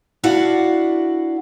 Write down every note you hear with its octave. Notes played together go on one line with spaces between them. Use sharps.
D4 E4 F#4 D5 F5 F#5